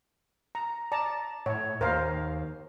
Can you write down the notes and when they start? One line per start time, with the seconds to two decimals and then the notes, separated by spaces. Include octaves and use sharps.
0.55 A#5
0.92 D5 A5 A#5
1.46 A2 C#5
1.81 D#2 A#4 C5 F5